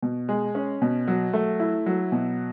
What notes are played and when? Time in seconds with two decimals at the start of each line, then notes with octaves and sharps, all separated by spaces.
0.02 B2
0.29 G#3
0.55 C#4
0.82 B2
1.08 F#3
1.33 A3
1.60 E4
1.86 F#3
2.12 B2